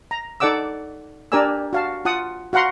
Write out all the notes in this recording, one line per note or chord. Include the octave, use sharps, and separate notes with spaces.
A#5
D#4 A4 D5 F#5 D6 E6
D4 G4 A#4 D5 G#5 E6
F#4 F5 A5
F4 F#5 A5 D#6
F#4 F5 F#5 A#5 C6